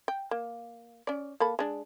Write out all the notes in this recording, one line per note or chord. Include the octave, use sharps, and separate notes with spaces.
G5
A#3
C#4 D5
A#3 A4 B5
G#3 D4